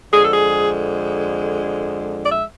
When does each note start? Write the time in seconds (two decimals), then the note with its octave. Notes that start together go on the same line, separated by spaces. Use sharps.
0.12 F2 D3 G#3 G#4
0.23 A4
0.32 G#4
2.24 D5
2.30 E5